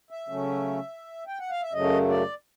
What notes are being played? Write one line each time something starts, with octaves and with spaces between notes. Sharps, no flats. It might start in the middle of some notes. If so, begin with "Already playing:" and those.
E5
C#3 F#3 A3 C#4
G5
F#5
F5
E5
F#2 C#3 F#3 A3 D#5
D5